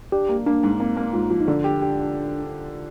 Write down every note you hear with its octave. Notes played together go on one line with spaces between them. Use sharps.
D4 G4
A#3
A#3 D4
G#2
A#3 C4
A#3
G#2 F4
F3
D#4
D3 D4
G4
G4